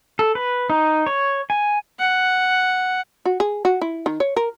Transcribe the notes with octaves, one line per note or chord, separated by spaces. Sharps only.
A4
B4
D#4
C#5
G#5
F#5
F#4
G#4
F#4
E4
D#3
C#5
A#4